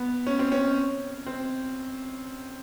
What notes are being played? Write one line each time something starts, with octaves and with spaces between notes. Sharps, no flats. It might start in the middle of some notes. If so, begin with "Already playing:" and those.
Already playing: B3
C#4
C4
C#4
C4